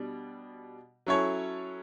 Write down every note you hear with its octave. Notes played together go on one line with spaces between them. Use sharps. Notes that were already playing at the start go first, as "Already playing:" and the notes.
Already playing: B2 G3 D4
F#3 C#4 E4 A4 C#5